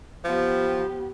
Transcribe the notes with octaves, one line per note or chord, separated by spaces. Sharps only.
F3 B3 G4